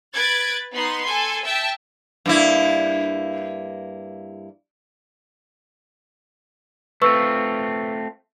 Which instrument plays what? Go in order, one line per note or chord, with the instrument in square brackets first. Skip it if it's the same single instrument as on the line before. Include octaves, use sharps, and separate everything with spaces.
[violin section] B4 F#6 G#6 A6 D7
B3 D#4 C6
A4 G#5 C6
E5 G5 A5
[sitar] G2 A#3 E4
[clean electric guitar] A3 C4 F4 [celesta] B4 C#6 E6